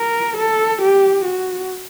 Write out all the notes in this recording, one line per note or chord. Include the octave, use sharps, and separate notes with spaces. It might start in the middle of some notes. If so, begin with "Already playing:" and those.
Already playing: A#4
A4
G4
F#4